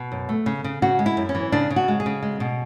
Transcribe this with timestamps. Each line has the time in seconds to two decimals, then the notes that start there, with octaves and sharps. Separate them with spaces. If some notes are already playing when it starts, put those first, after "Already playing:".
Already playing: B2
0.12 F#2
0.29 A3
0.46 C#3
0.64 C#3
0.82 C#3 F#4
0.99 G#3
1.06 E4
1.17 F#2
1.29 C#4
1.35 E3
1.52 C#3 D4
1.70 C#3
1.76 F#4
1.88 G#3
2.00 G#4
2.06 C#3
2.23 G#3
2.40 B2